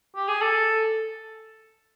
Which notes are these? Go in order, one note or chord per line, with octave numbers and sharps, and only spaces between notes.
G4
G#4
A4